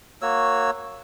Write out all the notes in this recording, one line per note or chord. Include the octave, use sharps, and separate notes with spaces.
A#3 F#4 C#5 E6